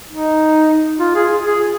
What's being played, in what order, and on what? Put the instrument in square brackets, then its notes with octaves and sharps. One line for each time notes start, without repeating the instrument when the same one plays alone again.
[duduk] D#4
F4
G#4
G#4